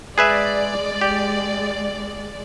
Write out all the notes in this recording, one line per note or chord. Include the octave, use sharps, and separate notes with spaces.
G#3 G#4 B4 D5 E5
G4